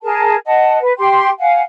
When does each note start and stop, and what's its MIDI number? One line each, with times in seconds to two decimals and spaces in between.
0.03 0.36 68
0.03 0.36 70
0.03 0.36 81
0.45 0.77 75
0.45 0.77 78
0.45 0.77 81
0.80 0.92 71
0.98 1.29 67
0.98 1.29 79
0.98 1.29 84
1.39 1.61 77
1.39 1.61 78
1.39 1.61 80